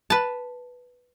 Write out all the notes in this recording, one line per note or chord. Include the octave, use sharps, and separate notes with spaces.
B4 A5